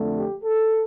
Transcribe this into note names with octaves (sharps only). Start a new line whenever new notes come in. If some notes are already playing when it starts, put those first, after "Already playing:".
Already playing: F2 D3 A3
G4
A4